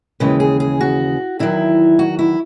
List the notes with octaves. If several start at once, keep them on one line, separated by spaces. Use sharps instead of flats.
D#2 C#3 E3 G#3 B4
G#4
G#4
F#4
E2 D#3 F#3 E4
F#4
E4